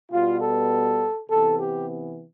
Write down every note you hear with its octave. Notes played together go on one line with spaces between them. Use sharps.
B2 G3 B3 F4
A4
C3 E3 B3 A4
G4